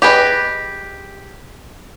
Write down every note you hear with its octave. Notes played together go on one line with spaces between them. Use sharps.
G4 G#4 B4 D#5